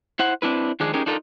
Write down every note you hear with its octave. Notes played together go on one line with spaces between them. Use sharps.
E4 C5 F#5
C4 D4 E4 B4
D#3 F3 G#3 D4 G#4
C#4 D#4 G4 G#4 A#4
D4 D#4 F4 A4 A#4